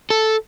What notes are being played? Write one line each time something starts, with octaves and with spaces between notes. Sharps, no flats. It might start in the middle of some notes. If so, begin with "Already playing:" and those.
A4